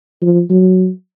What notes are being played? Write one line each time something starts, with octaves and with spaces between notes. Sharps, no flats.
F3
F#3